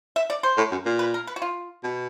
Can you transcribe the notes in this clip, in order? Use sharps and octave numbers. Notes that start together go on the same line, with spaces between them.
E5
D5
C5
A2
F#2
A#2
B4
A#4
B4
F#4
F4
B2